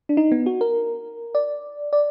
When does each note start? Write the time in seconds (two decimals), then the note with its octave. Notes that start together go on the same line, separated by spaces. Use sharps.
0.09 D4
0.17 D#4
0.32 B3
0.46 F#4
0.61 A#4
1.35 D5
1.93 D5